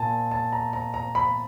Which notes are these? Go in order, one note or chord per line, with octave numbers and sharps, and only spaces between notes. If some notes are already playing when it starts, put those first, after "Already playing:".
Already playing: A#2 G#5 A5
A5
A#5
A#5
A#5
B5